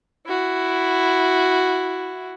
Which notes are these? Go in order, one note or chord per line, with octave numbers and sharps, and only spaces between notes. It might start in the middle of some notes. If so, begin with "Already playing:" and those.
E4 F#4